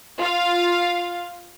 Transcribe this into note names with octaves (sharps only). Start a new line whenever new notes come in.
F4 F5